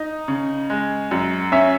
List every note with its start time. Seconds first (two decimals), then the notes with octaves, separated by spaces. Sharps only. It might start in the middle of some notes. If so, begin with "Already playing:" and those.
Already playing: D#4
0.28 C#3
0.70 G#3
1.11 F#2
1.52 C#4 E5